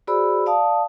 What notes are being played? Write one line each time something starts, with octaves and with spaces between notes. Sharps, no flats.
F#4 G#4 C5 D5 B5 E6
D5 F5 A5 D#6